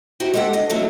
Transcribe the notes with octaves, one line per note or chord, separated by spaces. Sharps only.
D#4 E4 F#4 G4 C5
G#3 D4 G4 A4 F#5
D2 D4 D#5
C3 E3 F#3 A3 A#3 C#4